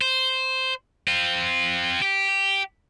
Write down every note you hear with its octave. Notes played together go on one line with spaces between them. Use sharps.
C5
C4 F4
G4